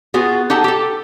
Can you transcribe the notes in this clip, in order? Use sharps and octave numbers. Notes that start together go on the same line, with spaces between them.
B3 F4 F#4 G#4
D#4 G4 A4 F#5 A5
G4 A4